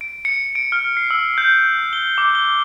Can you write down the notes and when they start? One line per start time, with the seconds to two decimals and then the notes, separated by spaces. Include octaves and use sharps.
0.01 D7
0.25 C#7
0.55 D7
0.72 F6
0.97 C7
1.10 E6
1.38 G6
1.93 G7
2.18 D6
2.35 G7